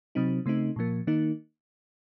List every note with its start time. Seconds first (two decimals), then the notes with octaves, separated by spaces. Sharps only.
0.15 C3 F#3 C4 D#4
0.46 C#3 A3 C4 D#4
0.76 A#2 F3 A#3
1.07 D#3 A#3 D#4